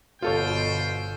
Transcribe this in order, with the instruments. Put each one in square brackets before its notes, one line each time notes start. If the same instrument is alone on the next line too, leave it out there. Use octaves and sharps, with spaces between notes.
[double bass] G1 [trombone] B2 [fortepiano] F4 A4 C#5 [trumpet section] C5 G5